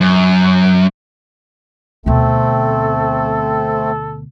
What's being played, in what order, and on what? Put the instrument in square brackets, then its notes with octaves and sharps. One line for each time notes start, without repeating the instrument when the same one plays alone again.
[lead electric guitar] F#2
[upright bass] D2 B2 [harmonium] A3 C4 [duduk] A4